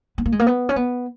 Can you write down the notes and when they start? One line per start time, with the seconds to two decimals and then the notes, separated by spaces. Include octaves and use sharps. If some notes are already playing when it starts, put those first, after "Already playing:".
0.18 B3
0.26 A#3
0.32 G#3
0.39 A#3
0.47 B3
0.69 C#4
0.76 B3